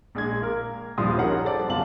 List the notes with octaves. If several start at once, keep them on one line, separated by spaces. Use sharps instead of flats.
A#1 G#3 D4 G#6
A#3 A#4
D#1 A#1 G2 F3 C6 D#6
C#4 D#4 G4 A#4 F#5 A#5
A4 C5 D5
D1 G1 F#2 F4 A5 F#7